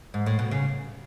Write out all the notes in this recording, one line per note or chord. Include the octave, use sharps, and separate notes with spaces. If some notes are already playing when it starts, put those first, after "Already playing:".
G#2
A2
B2
C#3